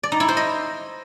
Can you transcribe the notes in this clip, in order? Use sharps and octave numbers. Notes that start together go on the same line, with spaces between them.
D5
D#4
E4
C5
D#5